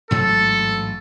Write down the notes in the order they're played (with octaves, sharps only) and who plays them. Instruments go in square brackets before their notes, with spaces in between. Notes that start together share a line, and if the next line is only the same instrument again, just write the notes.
[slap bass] A1 G#2 F#3 [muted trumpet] A4